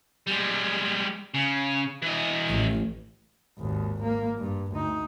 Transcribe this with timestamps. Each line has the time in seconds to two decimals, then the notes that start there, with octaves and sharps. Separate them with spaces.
0.27 G3 G#3
1.34 C#3
2.02 E3 D#5
2.48 A1
3.59 G#1 D#2
4.03 A#3
4.38 G2
4.73 D2 D#4